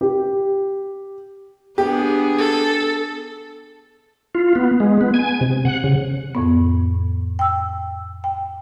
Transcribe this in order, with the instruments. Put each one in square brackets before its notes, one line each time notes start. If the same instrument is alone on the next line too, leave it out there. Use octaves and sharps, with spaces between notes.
[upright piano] G4
[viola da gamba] B3 D4 G#4 [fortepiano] G4
[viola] A4
[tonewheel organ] F4
B3
G#3
B3
G#5
C3
F#5
C#3
[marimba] F2 A2 B3
G5 E6
G5